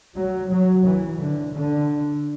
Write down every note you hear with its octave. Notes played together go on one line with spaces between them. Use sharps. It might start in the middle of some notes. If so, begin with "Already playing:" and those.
F#3
F#3
E3
D3
D3